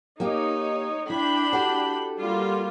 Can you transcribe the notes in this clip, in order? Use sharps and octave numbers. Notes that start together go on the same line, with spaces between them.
A#3 D#4 G4 C#5
D4 E4 G5 B5
F#4 G4 A4
G3 A#3 F4